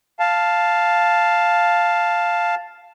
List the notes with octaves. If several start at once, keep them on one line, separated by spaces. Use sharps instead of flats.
F5 A5